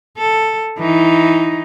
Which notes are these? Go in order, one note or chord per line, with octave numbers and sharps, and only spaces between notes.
A4
E3 D#4